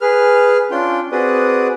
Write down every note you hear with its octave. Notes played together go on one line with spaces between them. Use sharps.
G#4 B4 F6
C#4 D4 F4 G5 C6
C4 F#4 G#4 B4 D5 D#6